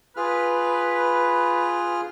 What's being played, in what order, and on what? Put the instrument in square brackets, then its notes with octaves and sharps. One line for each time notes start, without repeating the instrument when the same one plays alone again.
[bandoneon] F4 G#4 F6 [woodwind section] B4